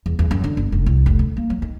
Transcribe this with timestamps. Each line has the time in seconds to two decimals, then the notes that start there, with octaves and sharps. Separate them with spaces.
0.06 E2
0.19 E2
0.31 F#2
0.44 D3
0.57 G1
0.72 F1
0.86 C2
1.06 F1
1.19 D2
1.37 A#3
1.50 F#3
1.62 D#3